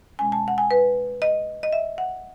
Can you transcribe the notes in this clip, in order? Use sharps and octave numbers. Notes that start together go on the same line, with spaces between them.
B2 G#3 C#4 G#5
A5
F#5
G#5
B4
D#5
D#5
E5
F#5